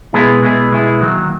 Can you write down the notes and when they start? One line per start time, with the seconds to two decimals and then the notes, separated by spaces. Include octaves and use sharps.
0.13 B2 G#3 B3 E4 G#4
0.42 B2 G#3 B3 E4 G#4
0.72 B2 G#3 B3 E4 G#4
1.00 D#3 F#3 A#3